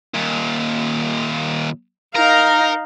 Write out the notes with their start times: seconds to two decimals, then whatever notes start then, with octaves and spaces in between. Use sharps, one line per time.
0.15 D#2 A#2
2.15 D#4 A#4 F5